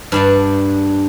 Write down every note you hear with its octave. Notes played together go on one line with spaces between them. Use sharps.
G2 D4 A5